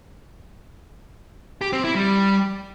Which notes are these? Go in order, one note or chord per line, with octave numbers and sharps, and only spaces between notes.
G4
C4
E4
G3